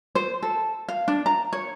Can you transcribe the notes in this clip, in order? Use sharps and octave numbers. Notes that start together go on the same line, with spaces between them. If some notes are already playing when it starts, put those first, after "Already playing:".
C5
A4
F5
D4
A#5
C#5